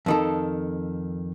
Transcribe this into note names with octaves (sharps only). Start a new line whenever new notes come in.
F2 D#3 A4